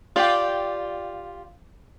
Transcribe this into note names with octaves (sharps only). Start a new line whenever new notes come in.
F4 G4 D5 G5